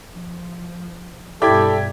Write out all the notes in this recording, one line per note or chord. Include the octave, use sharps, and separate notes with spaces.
F3
G2 B2 E4 G4 A4 D5 B5 G#6